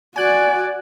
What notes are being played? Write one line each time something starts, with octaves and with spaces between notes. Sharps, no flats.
F#4 D5 G#5 F#6